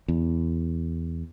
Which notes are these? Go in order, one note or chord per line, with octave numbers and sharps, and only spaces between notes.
E2